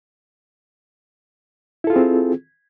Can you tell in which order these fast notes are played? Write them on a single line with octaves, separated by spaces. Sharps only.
E4 A4 F4 G#4 C4